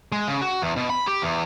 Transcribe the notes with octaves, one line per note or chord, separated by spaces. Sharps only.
G#3
C#3
F#4
E2
B2
B5
G4
E2